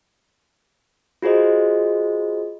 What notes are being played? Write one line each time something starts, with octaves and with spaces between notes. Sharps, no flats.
F4 F#4 G#4 C5 D#5